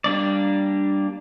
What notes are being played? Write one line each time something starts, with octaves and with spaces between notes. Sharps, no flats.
G3 A#3 D4 D5